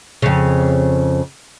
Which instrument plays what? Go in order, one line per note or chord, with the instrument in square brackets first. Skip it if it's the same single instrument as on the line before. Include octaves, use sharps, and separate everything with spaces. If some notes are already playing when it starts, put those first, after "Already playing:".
[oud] F2 C#3